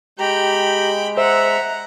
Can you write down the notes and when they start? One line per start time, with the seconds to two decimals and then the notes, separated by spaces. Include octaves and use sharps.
0.19 G#3 G4 G5 A#5 B5
1.17 C5 E5 F#5 A#5 E6